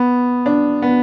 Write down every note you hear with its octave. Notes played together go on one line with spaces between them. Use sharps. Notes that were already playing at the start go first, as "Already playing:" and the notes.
Already playing: B3
D4
B3